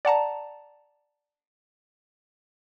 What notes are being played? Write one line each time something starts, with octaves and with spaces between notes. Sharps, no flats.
D5 F#5 A5 A#5